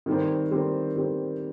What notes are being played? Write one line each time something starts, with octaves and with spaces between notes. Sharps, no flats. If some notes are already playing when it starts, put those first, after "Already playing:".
D#3 G3 C4 G4 C5
D#3 G3 C4 G4 C5
D#3 G3 C4 G4 C5